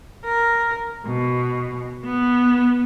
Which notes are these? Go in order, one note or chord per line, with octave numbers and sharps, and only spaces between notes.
A#4
B2
B3